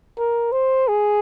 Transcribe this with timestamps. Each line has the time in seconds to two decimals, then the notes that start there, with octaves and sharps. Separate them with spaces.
0.18 A#4
0.52 C5
0.88 G#4